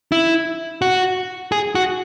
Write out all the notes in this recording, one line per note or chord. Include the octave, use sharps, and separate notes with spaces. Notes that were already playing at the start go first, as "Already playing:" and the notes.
E4
F#4
G#4
F#4